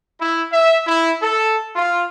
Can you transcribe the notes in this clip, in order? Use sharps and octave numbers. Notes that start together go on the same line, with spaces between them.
E4
E5
E4
A4
F4